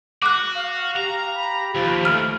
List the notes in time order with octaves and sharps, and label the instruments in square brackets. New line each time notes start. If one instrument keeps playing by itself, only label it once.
[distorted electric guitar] F#4 [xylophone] D6 F#6
[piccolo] F5
[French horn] G4 [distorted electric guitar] A#5
[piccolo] B5
[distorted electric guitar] D#2 [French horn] F3
[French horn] A3 [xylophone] F6